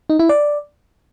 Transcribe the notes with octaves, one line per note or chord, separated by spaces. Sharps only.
D#4
E4
D5